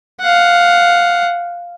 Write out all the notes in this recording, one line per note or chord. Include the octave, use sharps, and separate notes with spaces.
F5 F#5